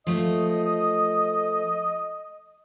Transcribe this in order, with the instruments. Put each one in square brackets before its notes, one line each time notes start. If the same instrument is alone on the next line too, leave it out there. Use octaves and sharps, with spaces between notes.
[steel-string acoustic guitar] F3 A3 [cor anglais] D#5